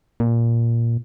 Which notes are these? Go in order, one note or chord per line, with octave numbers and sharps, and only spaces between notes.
A#2